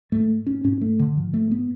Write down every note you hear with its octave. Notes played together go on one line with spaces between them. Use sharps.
G#2 A3
C#4
G#2 C#4
A3
D3
G#2 F3
A3
B3